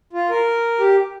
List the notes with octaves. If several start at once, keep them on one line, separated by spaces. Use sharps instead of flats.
F4
A#4
G4